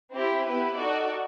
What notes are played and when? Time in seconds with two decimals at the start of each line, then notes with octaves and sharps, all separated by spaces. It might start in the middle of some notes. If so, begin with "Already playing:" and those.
0.12 C4 E4 G4
0.45 B3 E4 G4 B4
0.77 D#4 F#4 A4 D5